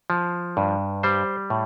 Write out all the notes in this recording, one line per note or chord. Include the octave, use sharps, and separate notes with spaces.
F3
G2
G3 C5
A2